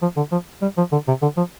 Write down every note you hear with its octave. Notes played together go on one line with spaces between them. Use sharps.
F3
D3
F3
G3
F3
D3
C3
D3
F3